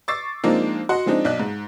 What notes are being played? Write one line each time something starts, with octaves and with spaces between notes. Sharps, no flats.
C#6 D6 E6 A6 C7
F3 G#3 A#3 C4 D4 D#4
F#4 D#5 F#5 C6
F3 G#3 C4 D4 D#4
B1 D5 D#5 F#6
G#2